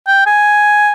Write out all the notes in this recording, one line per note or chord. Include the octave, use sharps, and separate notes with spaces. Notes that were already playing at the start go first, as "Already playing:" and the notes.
G5
G#5